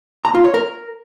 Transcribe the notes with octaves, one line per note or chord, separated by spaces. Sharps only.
A#5
F4
C#5
A#4